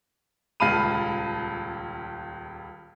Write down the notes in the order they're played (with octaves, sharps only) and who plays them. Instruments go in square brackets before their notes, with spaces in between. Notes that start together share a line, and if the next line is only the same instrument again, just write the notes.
[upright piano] D#1 C#2 F5 A5 B5 D#7